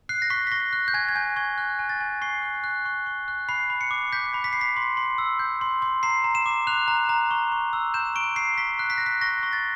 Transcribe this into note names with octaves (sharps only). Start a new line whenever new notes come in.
F#6 C7
A#6
C#6 B6
B6
C#6 A#6
F#6
G6
G#5 G#6
G#6
G#5 G6
C#6 G#6
F#6
G#5
A6
G#5
C#6 C7
F#6
F#6
C#6
C#6
F#6
B5 C7
B5
C#7
D6
G6 B6
B5
B6
B5 C7
B6
C6
C6
E6
G6
C6
C6
A#5 C7
A#5
E7
D6
F#6 F7
A#5
A#5
C#6
C#6
E6
G6 E7
C#6 D7
C#6 C7
C#6 B6
F#6
B6
F#6 A#6
B6
C#6 A#6
C#6
A6